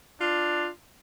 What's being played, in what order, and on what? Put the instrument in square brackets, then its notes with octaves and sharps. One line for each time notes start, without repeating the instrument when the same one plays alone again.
[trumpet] D4 [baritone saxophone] F4